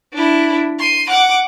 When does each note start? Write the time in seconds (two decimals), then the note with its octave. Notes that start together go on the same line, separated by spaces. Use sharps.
0.13 D4 E4
0.79 C6 D#7
1.09 F#5 D6